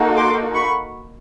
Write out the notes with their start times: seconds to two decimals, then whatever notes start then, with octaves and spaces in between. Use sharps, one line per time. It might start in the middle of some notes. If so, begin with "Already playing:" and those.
Already playing: A#3 D#4 F#4 A4
0.16 C6 D6
0.54 B5 C#6